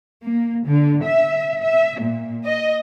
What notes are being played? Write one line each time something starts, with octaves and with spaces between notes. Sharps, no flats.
A#3
D3
E5
E5
A#2
D#5